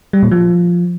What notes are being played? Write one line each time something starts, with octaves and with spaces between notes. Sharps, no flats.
G3
A#2
F3